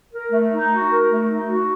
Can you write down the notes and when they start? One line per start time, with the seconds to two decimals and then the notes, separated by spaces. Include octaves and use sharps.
0.13 A#4
0.32 A3
0.52 D#4
0.72 F#4
0.91 A#4
1.10 A3
1.30 D#4
1.49 F#4